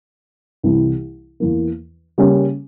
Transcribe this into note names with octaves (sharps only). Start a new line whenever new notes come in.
C2 C3 E3
E2 E3 A#3
C#3 G3 A#3 C#4